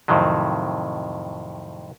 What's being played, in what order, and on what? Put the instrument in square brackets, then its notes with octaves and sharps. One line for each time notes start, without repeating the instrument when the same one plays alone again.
[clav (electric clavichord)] F2 A2 C3 D#3 F#3